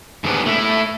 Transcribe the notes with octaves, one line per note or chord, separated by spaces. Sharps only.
G#2 C#3 G3 B3 C#4 D4
A3 E4